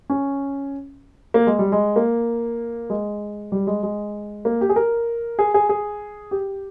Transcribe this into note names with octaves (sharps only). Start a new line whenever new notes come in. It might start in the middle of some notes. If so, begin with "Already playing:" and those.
C#4
A#3
G#3
G3
G#3
A#3
G#3
G3
G#3
G#3
A#3
G4
G#4
A#4
G#4
G#4
G#4
G4